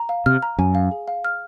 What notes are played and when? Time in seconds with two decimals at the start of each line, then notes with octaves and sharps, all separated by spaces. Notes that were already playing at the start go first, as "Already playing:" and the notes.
Already playing: A#5
0.09 F5
0.26 C3 F6
0.42 A#5
0.58 F#2 G#5
0.75 F5
0.91 G#4
1.08 F5
1.24 F6